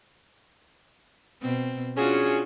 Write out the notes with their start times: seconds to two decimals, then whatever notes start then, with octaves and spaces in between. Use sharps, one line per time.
1.42 B2 C4
1.97 C#4 D4 F4 F#4 G#4